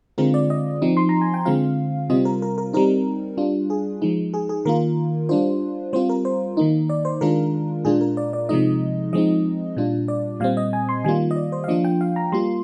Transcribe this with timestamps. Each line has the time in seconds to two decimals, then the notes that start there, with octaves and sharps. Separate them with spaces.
0.18 D3 G#3 C4 F4 A#4
0.34 D5
0.50 D#5
0.82 F3 C4 D#4
0.97 C6
1.09 A#5
1.21 G#5
1.34 G5
1.45 D3 G#3 C4 F4 F5
2.10 C3 G3 C4 F4 D#5
2.25 A#4
2.42 A#4
2.58 A#4
2.73 G3 C4 D#4 A#4
3.37 G3 D4 F4
3.70 G#4
4.02 F3 G#3 D#4
4.34 G#4
4.49 G#4
4.65 D#3 A#3 F4 A#4
5.29 G3 D4 F4 C5
5.93 G3 C4 F4 C5
6.09 A#4
6.25 C5
6.57 D#3 A#3 D#4
6.89 D5
7.05 C5
7.21 D#3 G#3 D4 F4 A#4
7.85 A#2 G#3 D4 F4 G#4
8.01 A#4
8.17 D5
8.33 D5
8.49 C3 F3 G#3 D#4 D#5
9.13 F3 G#3 C4 D#4 D#5
9.76 A#2 G3 D4 F4
10.08 D5
10.40 A#2 G3 C4 F5
10.57 D#5
10.73 G#5
10.89 C6
11.04 D#3 G3 A#3 F4 G#5
11.31 D#5
11.36 D5
11.52 C5
11.64 F5
11.68 F3 A#3 D4 F4 D#5
11.84 G5
12.01 F5
12.16 A#5
12.32 G3 A#3 F4 C6